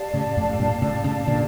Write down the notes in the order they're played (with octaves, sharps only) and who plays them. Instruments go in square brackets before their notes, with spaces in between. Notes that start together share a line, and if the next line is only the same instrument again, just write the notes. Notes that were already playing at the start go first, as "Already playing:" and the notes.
Already playing: [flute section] G4 D5 F5 A5
[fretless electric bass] A2 C#3
F2 A2
A2
G2 A#2
A2 C#3
A2 C#3
A#2 D3